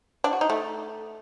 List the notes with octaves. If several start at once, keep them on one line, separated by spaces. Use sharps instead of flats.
D4
F#4
D#4
A3